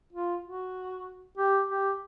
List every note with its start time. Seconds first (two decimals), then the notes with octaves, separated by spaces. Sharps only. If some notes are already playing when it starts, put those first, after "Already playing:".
0.13 F4
0.44 F#4
1.38 G4
1.69 G4